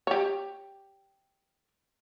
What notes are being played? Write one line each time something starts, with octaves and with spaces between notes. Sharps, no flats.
G4 C#5